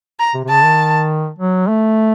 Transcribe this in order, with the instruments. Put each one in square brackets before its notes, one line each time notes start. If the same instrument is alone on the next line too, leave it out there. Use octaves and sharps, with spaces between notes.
[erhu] A#5
[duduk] C3
C3
[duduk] C#3 [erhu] A5
[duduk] D#3
F#3
A3